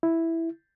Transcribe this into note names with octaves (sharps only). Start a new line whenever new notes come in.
E4